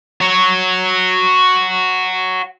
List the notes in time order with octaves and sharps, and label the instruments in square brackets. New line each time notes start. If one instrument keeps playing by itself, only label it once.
[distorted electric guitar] F#4 C#5